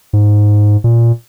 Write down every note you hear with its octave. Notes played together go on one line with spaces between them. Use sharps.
G#2
A#2